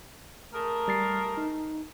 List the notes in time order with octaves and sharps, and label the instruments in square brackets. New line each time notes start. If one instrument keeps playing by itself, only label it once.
[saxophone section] A3 G#4 A#4
[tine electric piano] G3 A6 C7
D#4